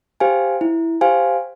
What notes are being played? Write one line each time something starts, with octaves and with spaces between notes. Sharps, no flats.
G4 C5 F5 G#5
E4
G4 C5 F5 G#5